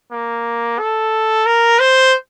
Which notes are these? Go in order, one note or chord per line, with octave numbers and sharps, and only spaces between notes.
A#3
A4
A#4
C5